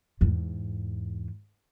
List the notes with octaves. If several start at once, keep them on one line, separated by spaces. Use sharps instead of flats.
E2 G#2